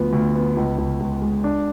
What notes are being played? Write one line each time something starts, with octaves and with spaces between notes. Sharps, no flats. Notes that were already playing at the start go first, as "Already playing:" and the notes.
Already playing: D2 F3 B3
D2
B3
C#2
C#2
C#2
G#3
D4